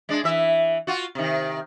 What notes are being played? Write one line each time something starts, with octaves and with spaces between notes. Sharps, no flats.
G#3 D4
E3 E5
F4 F#4
C3 D#3